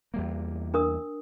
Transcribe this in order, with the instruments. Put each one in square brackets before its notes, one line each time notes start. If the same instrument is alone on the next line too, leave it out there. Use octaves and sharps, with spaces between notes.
[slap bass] E2 G3 A#3
[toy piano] D4 A#4 D#6